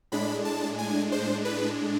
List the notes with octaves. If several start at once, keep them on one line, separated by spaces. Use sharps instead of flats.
A2 G#3 D4 B5
A5
G#5
C5
B4